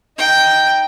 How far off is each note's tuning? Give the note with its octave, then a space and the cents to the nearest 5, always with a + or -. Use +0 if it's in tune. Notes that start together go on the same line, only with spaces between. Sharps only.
D#4 +0 G5 +0